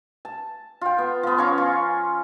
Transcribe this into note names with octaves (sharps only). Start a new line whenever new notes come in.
A5
F4 G5
B3
F3 B3
C#4 C#5 F5 A#5
F4